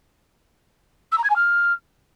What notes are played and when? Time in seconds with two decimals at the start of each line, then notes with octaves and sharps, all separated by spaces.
1.12 E6
1.18 A#5
1.24 G#6
1.30 G#5
1.36 F6